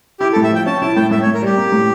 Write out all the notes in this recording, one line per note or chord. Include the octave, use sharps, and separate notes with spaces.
E4 G4
A4
A2
E5
F3 G5
C#4 A5
E4 A5
A2 G5
A2 E5
C#5
A2
A#4
G3 G4
A#3
A2